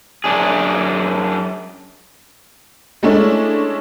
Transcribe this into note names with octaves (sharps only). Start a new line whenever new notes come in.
F#2 D4 G#4
G#3 A3 C#4 D4 E4